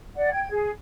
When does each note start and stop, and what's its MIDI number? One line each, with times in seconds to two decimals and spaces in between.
0.16 0.29 74
0.16 0.29 78
0.32 0.49 79
0.32 0.49 92
0.50 0.69 68